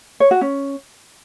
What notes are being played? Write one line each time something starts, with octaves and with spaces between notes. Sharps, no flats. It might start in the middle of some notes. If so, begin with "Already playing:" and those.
C#5
F#4
C#4